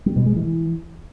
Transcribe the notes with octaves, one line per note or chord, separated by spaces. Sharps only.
G3
B2
G#3
E3